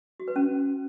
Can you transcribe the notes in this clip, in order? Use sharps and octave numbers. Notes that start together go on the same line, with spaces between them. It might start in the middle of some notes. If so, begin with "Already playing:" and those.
F#4
B4
C#4